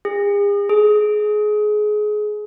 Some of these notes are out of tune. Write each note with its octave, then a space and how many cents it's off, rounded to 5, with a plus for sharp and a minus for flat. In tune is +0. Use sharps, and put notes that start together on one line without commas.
G#4 -40
G#4 +25